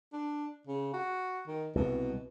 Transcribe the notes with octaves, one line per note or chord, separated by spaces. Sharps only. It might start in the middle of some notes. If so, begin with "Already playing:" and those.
D4
C#3
F#4
D#3
C2 B2